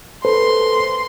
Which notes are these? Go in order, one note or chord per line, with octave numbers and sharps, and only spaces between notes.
A4 B4 C5 C6